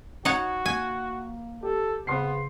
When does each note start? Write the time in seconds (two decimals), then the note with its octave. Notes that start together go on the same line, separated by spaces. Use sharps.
0.25 D#4 F#4 C#5 F#5
0.66 A#3 G#5
1.63 G4 A4
2.07 C#3 B3 C4 C6 C7